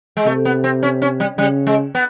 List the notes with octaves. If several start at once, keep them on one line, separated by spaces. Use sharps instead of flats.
G#3
C3 A3
B3
C4
C#4
C#4
G3
C#3 G3
G#3
B3